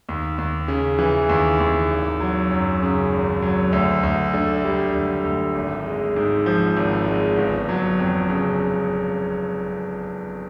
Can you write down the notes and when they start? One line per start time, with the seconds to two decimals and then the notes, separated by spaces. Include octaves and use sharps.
0.09 D#2
0.38 D#2
0.68 C#3
0.99 E3
1.29 D#2
1.60 D#2
1.90 G#1
2.20 F#3
2.51 F#2
2.82 C#3
3.13 G#1
3.42 F#3
3.72 D2
4.03 D2
4.34 D3
4.65 G3
4.95 D2
5.24 D2
5.55 G#1
5.86 G#3
6.16 G#2
6.46 F3
6.77 G#1
7.07 G#3
7.38 G1
7.69 F#3
7.99 F2
8.29 C#3